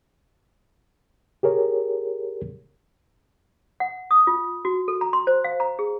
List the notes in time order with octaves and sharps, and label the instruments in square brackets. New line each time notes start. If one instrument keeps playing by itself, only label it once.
[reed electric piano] G4 G#4 A#4 C#5
[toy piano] F#5
D#6
F4
F#4
A4
A#5
C6
C5
F5
A#5
G#4